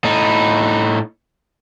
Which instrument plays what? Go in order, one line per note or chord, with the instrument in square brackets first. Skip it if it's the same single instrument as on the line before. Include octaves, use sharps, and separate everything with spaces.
[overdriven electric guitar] A2 D#4